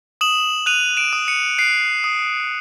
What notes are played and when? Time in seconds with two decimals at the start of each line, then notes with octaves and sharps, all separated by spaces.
0.21 D#6 E7 F#7
0.66 F#6 D#7 F7
0.97 D7 E7
1.13 D#6
1.28 C#7 D#7
1.58 F#6 C7 D7
2.04 D#6